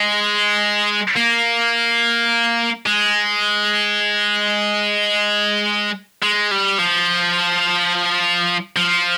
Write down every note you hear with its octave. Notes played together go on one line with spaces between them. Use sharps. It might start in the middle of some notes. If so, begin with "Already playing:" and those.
Already playing: G#3
A#3
G#3
G#3
G3
F3
F3